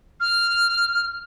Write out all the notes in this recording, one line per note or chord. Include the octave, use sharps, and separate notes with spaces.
F6